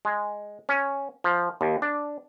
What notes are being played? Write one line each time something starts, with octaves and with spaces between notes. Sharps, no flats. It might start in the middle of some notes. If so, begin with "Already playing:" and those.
G#3
C#4
F3
D#2
D4